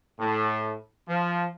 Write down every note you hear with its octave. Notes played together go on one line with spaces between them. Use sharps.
A2
F3